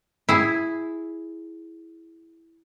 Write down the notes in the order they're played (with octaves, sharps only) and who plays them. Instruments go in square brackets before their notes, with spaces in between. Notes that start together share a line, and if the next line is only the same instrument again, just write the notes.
[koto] E4 G#4